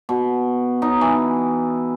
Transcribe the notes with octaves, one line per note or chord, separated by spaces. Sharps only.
B2
D#4
E3